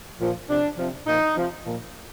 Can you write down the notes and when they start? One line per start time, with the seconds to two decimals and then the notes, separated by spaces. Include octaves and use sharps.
0.20 A#2 F3
0.49 C3 F3 D4
0.78 C3 F3
1.07 A#2 F3 D#4
1.36 C3 F3
1.65 A#2 F3